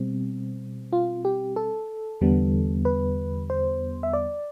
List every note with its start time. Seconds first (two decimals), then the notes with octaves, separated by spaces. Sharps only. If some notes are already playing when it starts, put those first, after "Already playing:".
Already playing: B2 G3 C4
0.93 F4
1.25 G4
1.56 A4
2.21 E2 D3 G3 B3
2.85 B4
3.50 C5
4.03 E5
4.13 D5